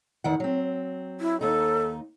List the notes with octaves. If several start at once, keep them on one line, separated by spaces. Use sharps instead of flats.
E2 D#3 F#5
F#3 C4
E4
D#2 D#4 A4